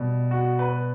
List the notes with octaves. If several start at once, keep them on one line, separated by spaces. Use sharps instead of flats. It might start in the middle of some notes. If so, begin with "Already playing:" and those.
Already playing: B2 G3
F#4
B4